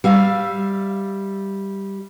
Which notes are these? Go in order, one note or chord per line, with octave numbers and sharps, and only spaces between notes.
G3 E5 F5